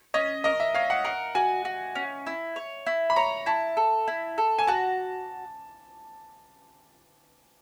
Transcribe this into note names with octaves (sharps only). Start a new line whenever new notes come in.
C#4 D#5
A#4 D#5
E5
C#4 F5
F#5
A#4 F#5
F#4 G#5
F#4
C#4
E4
C#5
E4
B5
C#5 A#5
E4 A5
A4
E4
A4
G#5
F#4 A5